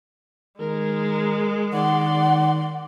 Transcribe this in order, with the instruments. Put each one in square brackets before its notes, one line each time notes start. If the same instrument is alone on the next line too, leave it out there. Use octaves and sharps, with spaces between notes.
[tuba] D#3 [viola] G#3 [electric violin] A#4
[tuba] D#3 [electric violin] D5 C6 [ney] F#5